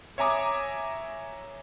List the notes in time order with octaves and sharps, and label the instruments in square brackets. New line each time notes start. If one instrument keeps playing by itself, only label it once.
[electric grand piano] C#5 E5 G#5 A#5 D6 D#6